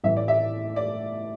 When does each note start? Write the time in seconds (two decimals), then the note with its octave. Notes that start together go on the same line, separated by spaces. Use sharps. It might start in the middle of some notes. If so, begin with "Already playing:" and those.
0.04 A1 A2 E3 E5
0.17 D5
0.28 E5
0.76 D5